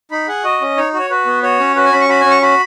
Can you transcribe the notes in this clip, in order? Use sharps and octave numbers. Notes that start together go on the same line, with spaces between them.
D#4 B5
G#4 F#5
F#4 D#5
C#4
D#4 C#5
F#4
C#5
F#4 B4
B3
F#4 C#5
C#4
F#4 B4
G#5
C#4 B5
C#6
F#4 B5
C#4 G#5
C#6
F#4 B5